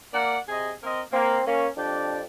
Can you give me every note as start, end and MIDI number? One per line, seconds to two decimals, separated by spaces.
0.14 0.38 58
0.14 0.38 74
0.14 0.38 78
0.49 0.73 48
0.49 0.73 68
0.49 0.73 75
0.84 1.02 60
0.84 1.02 70
0.84 1.02 75
1.13 1.40 58
1.13 1.44 60
1.47 1.67 58
1.47 1.69 61
1.77 2.24 41
1.77 2.19 62
1.77 2.19 67
1.77 2.19 74